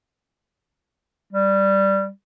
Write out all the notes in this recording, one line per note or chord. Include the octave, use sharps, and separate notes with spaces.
G3